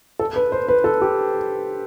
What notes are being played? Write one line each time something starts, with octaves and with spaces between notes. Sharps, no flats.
A4
B4
C5
B4
A4
G4